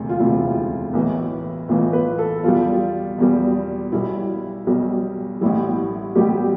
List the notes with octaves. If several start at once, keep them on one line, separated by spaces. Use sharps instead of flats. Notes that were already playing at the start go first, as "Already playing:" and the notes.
Already playing: E1 D2 C3
F4
E1 D2 C3 E4
B1 A2 E3
B1 A2 E3 F4
B4
A4
E2 B2 G3 F4
E2 B2 G3
B1 B2 G3 E4
B1 B2 G3
A1 A2 G3 E4
A1 A2 G3 G4